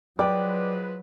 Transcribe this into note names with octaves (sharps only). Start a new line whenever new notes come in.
F3 F#3 G#3 B4 D5 G5 D6